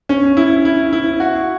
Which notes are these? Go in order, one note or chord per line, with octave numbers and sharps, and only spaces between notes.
C#4
E4
E4
E4
F#4